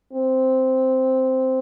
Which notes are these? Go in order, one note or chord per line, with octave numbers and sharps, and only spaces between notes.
C4